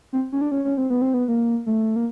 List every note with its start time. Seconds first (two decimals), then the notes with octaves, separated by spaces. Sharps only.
0.13 C4
0.32 C#4
0.41 D4
0.51 C#4
0.65 C#4
0.77 C4
0.90 B3
1.02 C4
1.14 B3
1.28 A#3
1.66 A3
1.96 A#3